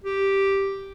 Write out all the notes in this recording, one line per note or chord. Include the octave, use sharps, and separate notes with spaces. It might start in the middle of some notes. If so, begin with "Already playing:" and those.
G4